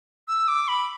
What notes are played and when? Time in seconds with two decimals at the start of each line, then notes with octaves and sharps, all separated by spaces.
0.28 E6
0.48 D6
0.68 B5